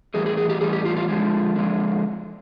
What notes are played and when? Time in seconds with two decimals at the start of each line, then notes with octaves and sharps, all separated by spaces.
0.14 A2 E3 G3 G#4
0.26 G#4
0.37 G#4
0.49 G4
0.61 A2 E3 G3 G#4
0.73 G4
0.85 F4
0.97 F4
1.08 D3 F3 G#3
1.56 D3 F3 G#3